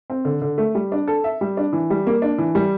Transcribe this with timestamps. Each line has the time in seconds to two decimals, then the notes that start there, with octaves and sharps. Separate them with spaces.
0.10 C4
0.25 D3
0.42 D3
0.58 A3
0.75 G3
0.92 D4
1.08 A4
1.24 E5
1.41 G3
1.57 D4
1.73 E3
1.90 G3
2.07 A#3
2.22 D4
2.38 E3
2.55 G3